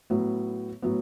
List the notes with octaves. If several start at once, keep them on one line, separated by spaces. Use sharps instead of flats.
A2 F#3 B3
A2 F#3 B3